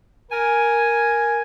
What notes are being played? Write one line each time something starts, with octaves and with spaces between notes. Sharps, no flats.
A#4 G#5